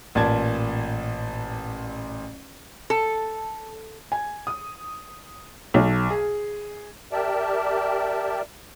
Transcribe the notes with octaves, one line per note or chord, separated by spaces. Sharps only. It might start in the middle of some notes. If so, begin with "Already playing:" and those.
A1 A#2 D5 A5 G#6
A4
G#5
D#6
B1
G#4
G4 A#4 D5 E5 G5 A5